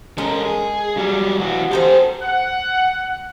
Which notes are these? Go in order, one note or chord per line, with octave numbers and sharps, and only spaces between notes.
G#3 C#4 A4 A#4
G#4
F#3 G3
E3 F#4
C4 G4 A4 C5 D#5
F#5